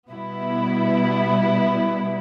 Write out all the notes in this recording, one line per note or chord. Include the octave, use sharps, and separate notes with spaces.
B2 G3 B3 E4